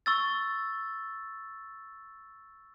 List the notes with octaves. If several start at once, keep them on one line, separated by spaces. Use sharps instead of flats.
C#6 E6 A6